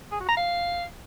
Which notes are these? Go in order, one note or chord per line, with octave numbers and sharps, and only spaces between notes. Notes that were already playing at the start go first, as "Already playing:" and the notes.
G#4
F#4
A#5
F5